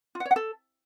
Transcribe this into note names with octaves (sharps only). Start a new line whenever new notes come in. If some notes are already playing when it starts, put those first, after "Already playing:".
F4
F#5
C#5
F#5
A4